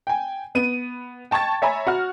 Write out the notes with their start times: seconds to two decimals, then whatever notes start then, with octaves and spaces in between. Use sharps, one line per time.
0.07 G5 G#5
0.55 B3 D#7
1.31 G5 A5 C#6 G#6 A6
1.62 C#5 E5 G#5 A#5 B5
1.87 F#4 F#5 F6